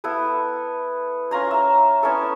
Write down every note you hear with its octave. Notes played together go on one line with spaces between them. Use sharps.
B3 E4 A4 B4
C#4 F4 A#5 C6
E5 A#5
B3 C#4 E4 A4